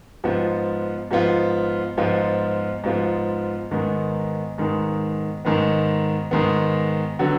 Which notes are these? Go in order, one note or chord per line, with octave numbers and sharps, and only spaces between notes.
G#2 F3 B3 F4
G#2 F3 B3 F4
G#2 F3 B3 F4
G#2 F3 B3 F4
G#2 D#3 G#3 B3
G#2 D#3 G#3 B3
G#2 D#3 G#3 B3
G#2 D#3 G#3 B3
D3 F#3 B3